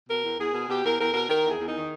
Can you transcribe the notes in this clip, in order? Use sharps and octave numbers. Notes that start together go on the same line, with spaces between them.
B2 A#4
E2
E2 G#4
B2
B2 G4
E2 A#4
E2 A#4
B2 A#4
D#3 A#4
E2
G#4
E2
D#4
D#3